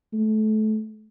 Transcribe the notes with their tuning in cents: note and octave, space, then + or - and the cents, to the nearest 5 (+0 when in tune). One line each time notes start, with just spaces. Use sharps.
A3 -25